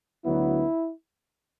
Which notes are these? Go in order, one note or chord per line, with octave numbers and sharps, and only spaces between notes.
D2 D3 F#3 B3 E4